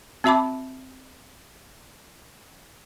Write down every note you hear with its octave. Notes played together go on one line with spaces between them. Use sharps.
C4 F#4 E5 A5 B5 D6